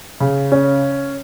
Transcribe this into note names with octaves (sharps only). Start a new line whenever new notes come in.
C#3
C#4